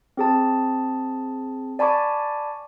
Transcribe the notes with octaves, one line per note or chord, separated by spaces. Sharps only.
C4 G#4 A5
D5 G#5 A5 B5 C#6 D6